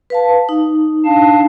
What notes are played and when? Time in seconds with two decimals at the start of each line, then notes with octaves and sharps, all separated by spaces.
0.10 B4 F5 A5
0.49 D#4
1.05 D4 F5 A5